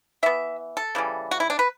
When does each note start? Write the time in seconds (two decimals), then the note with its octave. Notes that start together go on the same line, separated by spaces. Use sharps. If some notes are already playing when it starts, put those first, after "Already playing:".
0.23 E3 B3 E5
0.77 A4
0.95 C#3 E3 G3
1.31 F#4
1.40 E4
1.50 D4
1.59 B4